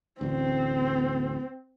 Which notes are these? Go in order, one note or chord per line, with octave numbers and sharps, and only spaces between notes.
A1 D2 C4